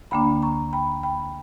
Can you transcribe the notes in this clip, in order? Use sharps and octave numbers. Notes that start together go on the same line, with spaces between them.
D2 D3 A#3 D4 G5 B5
A#5 C#6
G5 B5
G5 B5